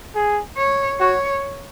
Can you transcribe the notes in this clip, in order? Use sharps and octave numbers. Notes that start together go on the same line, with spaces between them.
G#4
C#5
F#4 C#5